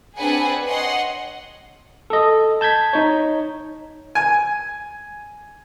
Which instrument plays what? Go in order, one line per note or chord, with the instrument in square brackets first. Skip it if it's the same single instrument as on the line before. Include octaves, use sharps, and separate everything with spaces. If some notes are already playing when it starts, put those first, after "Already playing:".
[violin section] C4 D4 G#4 B4 F#5 G#5
C#5 D#5 F#5 C6
[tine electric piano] A4 D#5
A5 G6 G#6 B6
D#4 C#5
[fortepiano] G#5